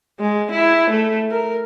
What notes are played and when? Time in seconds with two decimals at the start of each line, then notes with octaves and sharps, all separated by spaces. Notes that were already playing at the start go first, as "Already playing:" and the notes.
0.20 G#3
0.51 E4
0.90 A3
1.31 A#4